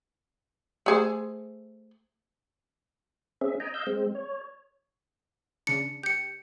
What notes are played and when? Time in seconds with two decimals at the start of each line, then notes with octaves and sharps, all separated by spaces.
0.86 A3 G#4 C5
3.41 C4 C#4 G#4 E5
3.60 D#5 G5 G#5 A#5
3.74 D#5 F5 E6 G6
3.87 G#3 C4
4.15 C#5
5.67 C#3 D4 C#7
6.03 G4 G6 C#7